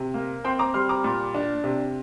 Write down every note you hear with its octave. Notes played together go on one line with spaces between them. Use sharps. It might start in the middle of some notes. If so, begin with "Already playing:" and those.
Already playing: C3
A#3
C4 G5 C6
A#5 D6
G3 C6 F6
A#5 D6
A#2
D4
C3